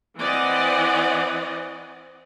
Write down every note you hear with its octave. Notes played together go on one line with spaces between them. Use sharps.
E3 C4 D5 D#5 F#5